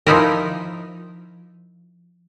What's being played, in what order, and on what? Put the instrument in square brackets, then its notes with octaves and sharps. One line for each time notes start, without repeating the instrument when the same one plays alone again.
[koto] F3 D#4 E4 A#4